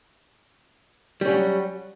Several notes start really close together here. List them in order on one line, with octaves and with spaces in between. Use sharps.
G3 C#4 F#3